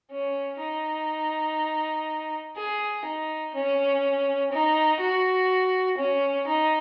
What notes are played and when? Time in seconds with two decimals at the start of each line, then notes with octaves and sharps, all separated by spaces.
0.11 C#4
0.60 D#4
2.56 G#4
3.06 D#4
3.54 C#4
4.52 D#4
5.00 F#4
5.98 C#4
6.46 D#4